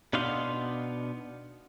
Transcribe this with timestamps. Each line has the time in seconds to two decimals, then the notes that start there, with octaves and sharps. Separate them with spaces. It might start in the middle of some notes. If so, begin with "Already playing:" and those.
0.13 B2 B3 D4 D#4 F5 C6